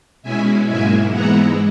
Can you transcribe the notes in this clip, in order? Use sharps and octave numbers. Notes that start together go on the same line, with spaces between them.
B2 G#3 C#4 E4 E5 G#5
G#2 F#3 A#3 E4 E5 G#5
G#2 E3 G#3 B3 E4 F#5 A#5